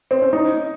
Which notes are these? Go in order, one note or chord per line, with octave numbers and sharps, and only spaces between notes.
C4
C#4
D#4